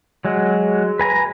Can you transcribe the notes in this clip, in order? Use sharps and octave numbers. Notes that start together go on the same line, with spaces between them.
F#3 G#3
B4 G#5 A#5